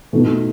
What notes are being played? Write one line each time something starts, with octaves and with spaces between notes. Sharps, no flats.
B2 A3 D#4